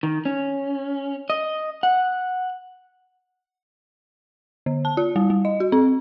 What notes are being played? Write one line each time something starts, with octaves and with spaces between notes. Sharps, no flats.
D#3
C#4
D#5
F#5
D3
A5
F4
G3
G3
D#5
F#4
C4